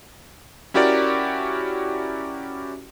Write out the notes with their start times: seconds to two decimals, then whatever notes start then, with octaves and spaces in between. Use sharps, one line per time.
0.74 C#4 E4 F#4 G4 A#4 D5